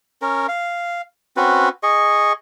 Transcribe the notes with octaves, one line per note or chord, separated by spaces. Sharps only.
C#4 A#4
F5
C4 C#4 F#4 B4
G#4 D#5 C#6